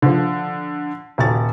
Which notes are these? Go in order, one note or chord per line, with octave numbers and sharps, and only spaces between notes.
D3 F3
D#1 F#4 A6